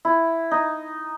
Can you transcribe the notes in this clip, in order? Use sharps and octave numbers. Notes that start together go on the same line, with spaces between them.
E4
D#4